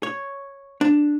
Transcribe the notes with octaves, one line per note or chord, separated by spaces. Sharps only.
C#5
D4